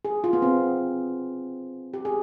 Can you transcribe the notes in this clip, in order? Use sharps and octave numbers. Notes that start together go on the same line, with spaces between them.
G#4
F4
B3
C4
G4
G#4